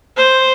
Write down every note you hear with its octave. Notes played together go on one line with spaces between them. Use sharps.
C5